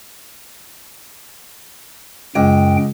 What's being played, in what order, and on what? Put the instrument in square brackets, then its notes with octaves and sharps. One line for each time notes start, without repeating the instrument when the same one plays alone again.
[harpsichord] C#2 [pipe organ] F#2 G5